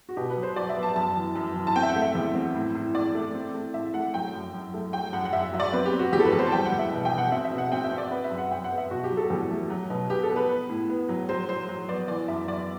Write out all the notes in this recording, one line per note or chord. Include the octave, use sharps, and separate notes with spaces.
F#4
B2 G4
B4
F#3
C5
F#3 D5
E5
B3
A5
F#2 A5
E3
F#2
E3
A5
C4 G5
E5
F#5
A3
E5
E2
C4
A2
A2
A2 D5
A3
C4
A3
A2 E5
A3 F#5
F#3 G5
F#2
F#2
A3
F#3 G5
F#2 F#5
F#5
F#2 E5
F#3 E5
D5
C4 B4
G4
C4
F#4
E2 G4
A4
B4
E2
C5
A5
G3 G5
F#5
E2
E5
B2
G5
B2
F#5
C4 E5
E5
B2
F#5
C4 G5
E5
C4
D5
B3 B4
E5
F#2
F#5
F#3 G5
F#5
B3
E5
B2 F#4
G4
F#3
A4
E2 G4
A3
F#3
B2
B3 G4
A4
B3
B4
B3
A2
B3
F#3
F#3 C5
F#3 C5
F#3
B3 D5
E3 D5
F#2 E5
B3 D5